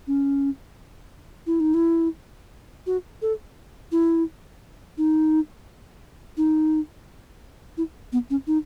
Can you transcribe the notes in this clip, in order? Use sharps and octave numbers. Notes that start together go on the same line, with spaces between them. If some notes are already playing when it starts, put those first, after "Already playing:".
C#4
E4
D#4
E4
F#4
A4
E4
D#4
D#4
E4
B3
C#4
D#4